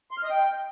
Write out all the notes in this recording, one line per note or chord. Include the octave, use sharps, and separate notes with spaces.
C6
F6
D#5
G5